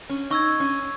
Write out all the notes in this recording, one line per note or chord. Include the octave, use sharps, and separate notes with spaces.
C#4
D#4 C#6 E6 G#6
C#4